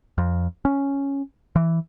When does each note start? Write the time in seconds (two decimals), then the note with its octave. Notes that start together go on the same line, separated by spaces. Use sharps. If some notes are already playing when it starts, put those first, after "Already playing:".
0.18 F2
0.65 C#4
1.56 E3